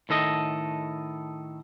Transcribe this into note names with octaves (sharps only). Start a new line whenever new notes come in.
A2 D#3 A4 D#5